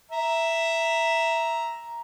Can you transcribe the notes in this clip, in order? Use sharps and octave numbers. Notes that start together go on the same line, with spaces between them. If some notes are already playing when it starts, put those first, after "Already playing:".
E5 A#5